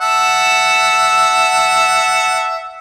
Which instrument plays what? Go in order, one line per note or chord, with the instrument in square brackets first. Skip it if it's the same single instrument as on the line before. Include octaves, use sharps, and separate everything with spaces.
[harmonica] E5 F#5 A5